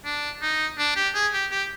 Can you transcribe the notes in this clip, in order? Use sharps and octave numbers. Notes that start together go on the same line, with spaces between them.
D4
D#4
D4
G4
G#4
G4
G4